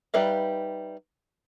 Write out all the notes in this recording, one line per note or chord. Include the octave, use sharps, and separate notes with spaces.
G3 D#4 B4 E5 F5